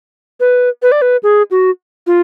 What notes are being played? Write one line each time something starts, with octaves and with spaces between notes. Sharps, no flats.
B4
B4
D5
B4
G#4
F#4
F4